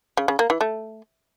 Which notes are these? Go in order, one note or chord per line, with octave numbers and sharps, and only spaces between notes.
C#3
C#3
A#3
E3
A3